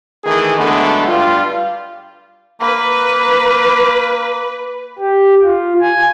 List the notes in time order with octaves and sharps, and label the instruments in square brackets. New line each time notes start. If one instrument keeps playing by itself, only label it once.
[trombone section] D#3 E3 A3 G#4
D3 F#3 G#3 A3 B3
G2 G3 F4
[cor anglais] A#3 [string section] B4
[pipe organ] G4
F4
G#5